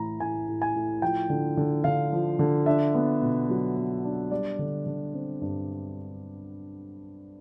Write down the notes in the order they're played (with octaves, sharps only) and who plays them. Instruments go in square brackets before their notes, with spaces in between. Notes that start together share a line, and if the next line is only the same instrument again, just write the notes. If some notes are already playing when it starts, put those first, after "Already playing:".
Already playing: [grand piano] A2 E3 A3 A#5 B5
A2 G#5
A2
G#5
A2
F3 G5
D3
D3
D3 F5
F3
D3
D4 E5
B3
B2
F#3
B3
D4
G3 D5
D3
D3
C4
G2